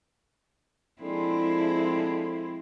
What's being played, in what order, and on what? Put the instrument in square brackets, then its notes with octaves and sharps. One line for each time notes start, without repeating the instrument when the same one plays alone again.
[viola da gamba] F3 G#3 C4 [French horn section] D4 G#4 A4 [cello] E4